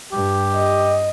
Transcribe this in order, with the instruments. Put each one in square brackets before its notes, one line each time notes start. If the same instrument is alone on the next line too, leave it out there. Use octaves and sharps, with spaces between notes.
[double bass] G2 [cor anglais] G4
[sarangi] D#5